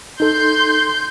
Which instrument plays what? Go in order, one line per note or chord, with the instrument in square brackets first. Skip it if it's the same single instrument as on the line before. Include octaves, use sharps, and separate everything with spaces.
[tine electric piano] D#4 A4 [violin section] C6 G6